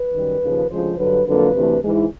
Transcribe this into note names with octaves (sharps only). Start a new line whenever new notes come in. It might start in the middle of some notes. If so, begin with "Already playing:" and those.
Already playing: B4
F#2 D#3 G3
D#2 C#3 F3
D2 C#3 F3 G#3 C5
G2 D3 F#3 B4
F2 D3 F#3 A#3 B4
D2 C3 E3 A3
G#2 E3 G#3